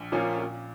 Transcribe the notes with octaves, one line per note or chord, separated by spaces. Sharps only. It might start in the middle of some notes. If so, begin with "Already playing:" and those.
Already playing: A#1
A#2 F3 A#3 C#4
A#2